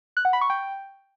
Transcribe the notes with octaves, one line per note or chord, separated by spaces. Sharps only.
F#6
F#5
B5
C#6
G5